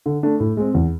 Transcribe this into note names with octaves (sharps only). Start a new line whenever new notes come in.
D3
A3 D4
A2
G#3 C4
E2